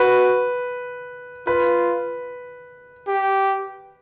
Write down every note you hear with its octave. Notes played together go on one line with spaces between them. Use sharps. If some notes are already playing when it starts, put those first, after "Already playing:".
Already playing: F#4 B4
F4 B4
G4